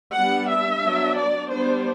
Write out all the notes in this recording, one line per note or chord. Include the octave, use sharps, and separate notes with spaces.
G3 B3 D4 F#5
E5
F#3 B3 D4
D5
G3 B3 D4 C5